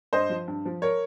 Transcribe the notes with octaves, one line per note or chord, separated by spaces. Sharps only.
G2 C5 D#5
F3
G2
F3
A#4 C#5